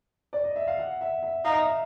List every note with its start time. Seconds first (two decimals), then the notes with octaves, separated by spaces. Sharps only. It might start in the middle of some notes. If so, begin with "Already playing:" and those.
0.33 D5
0.44 D#5
0.56 E5
0.67 F5
0.79 F#5
1.01 E5
1.23 E5
1.45 D#4 F5
1.61 E5